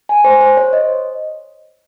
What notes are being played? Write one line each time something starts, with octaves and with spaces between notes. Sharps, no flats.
G#5
C5
C5
C#5
D#5